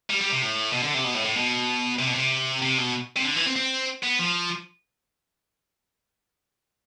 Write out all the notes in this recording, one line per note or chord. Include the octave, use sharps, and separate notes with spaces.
G3
G3
C3
A2
B2
D3
C3
B2
A2
A2
B2
C3
B2
C3
C3
B2
C3
D3
E3
C4
C4
B3
F3